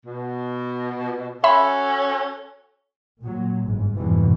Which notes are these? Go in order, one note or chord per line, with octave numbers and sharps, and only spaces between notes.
B2
C#4 F#4 A4 E5 B5
A#2 F#3
G1 G#2
G#1 F2 G#2 B2 E3 G3